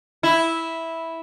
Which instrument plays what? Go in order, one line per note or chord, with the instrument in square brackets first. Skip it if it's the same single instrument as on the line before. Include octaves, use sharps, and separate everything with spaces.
[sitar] E4